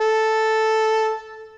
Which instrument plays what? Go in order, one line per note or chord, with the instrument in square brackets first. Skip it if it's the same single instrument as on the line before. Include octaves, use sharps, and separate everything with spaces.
[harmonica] A4